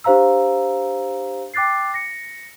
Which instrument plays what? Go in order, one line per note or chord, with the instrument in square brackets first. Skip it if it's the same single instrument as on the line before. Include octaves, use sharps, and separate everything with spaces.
[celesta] D4 G4 C5 F5 A#5 E6
G5 D6 F#6 A6 C7
A#6 C#7